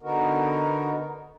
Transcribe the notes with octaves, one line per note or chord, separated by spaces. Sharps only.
D3 B3 D#4 F#4 A#4